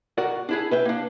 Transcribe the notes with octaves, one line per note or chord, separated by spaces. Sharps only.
F#4 A#4 D5
D4 E4 G#4
B4 E5 G5
A#3 D4